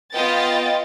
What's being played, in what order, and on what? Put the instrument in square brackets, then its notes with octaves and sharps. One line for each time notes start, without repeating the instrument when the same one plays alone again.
[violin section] B3 F4 D#5 G5 A6